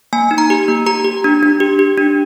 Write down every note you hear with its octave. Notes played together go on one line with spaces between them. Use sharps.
A#3 G#5
D#4
A#5
G4
A#3
G4 A#5
G4
D4
D4
G4
G4
D4